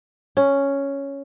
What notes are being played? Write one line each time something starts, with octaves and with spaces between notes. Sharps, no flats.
C#4